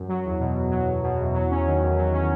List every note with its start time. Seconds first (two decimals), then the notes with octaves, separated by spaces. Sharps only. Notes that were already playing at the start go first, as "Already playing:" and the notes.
Already playing: F#2
0.08 F#3
0.24 E2
0.39 B2
0.55 E2
0.71 F#3
0.86 E2
1.03 B2
1.19 E2
1.34 F#3
1.50 C#4
1.66 D#3
1.82 E2
1.97 F#3
2.13 C#4